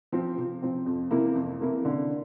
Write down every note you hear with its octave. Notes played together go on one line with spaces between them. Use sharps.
F3 C4
C3
F3 C4
F2
C3 E3 A#3 E4
F2
C3 E3 A#3 E4
D3